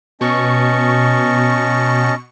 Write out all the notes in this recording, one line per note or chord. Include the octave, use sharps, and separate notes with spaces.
B2 C#4 D#5 A5 C#6